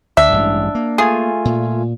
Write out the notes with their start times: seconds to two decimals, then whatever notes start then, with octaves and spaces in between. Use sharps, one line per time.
0.17 D2 D4 E5
0.32 A1 G2 G#3
0.75 A#3
0.98 A3 F4 G#4 G#5
1.45 A#2